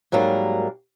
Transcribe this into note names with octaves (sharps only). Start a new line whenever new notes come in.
G#2 F#3 G3 A#3 A#4